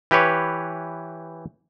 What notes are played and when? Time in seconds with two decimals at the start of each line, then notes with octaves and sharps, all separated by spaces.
0.11 E3 G4 B4 C#5